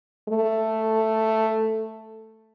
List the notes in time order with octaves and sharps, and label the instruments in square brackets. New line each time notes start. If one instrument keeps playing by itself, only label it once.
[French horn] A3